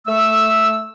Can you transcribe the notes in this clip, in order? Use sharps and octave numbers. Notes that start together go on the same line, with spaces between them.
A3 E6